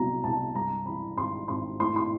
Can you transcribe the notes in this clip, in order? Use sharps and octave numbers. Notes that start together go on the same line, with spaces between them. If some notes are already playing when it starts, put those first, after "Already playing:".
Already playing: C2 B2 F#3 A#5
C2 A5
G2 A#5
E3 B5
G#1 C6
G#1 C6
A2 C6
C6